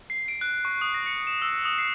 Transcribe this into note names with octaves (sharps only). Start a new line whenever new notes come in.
C7
D7
F#6
C#6
D#6
A#6
C#7
E7
E6
D#6
C7